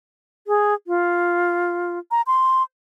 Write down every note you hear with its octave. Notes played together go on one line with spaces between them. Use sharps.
G#4
F4
A#5
C6